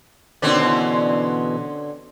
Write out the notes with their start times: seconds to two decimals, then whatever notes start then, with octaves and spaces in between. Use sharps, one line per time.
0.42 B2 D3 D#3 C4 C#4 D5
0.61 B2 E3